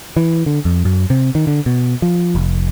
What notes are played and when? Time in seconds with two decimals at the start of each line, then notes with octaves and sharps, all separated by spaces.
0.17 E3
0.46 D3
0.65 F2
0.85 F#2
1.10 C3
1.35 D#3
1.47 D3
1.66 B2
2.02 F3
2.35 F1